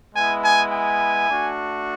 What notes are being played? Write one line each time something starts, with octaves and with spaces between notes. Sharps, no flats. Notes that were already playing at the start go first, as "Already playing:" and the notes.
G#3 B3 E4 G#5
G#5
G#5
A3 D4 F#4